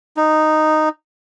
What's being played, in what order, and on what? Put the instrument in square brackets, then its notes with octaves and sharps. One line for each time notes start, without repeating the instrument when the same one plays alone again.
[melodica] D#4